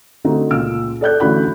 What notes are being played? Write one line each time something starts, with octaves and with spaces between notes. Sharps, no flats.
D3 A3 C4 D#4 F#4
C#2 A#2 F4 E6 F6 D7
A4 D5 F#6 G6
A1 D3 A3 F#4 B5 F#6